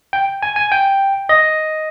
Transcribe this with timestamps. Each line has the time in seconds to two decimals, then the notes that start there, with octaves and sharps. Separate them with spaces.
0.13 G5
0.42 G#5
0.56 G#5
0.72 G5
1.29 D#5